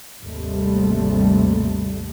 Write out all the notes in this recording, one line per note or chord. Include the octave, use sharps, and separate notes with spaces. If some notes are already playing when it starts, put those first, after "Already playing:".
G#1 D#2 C3 G3 A3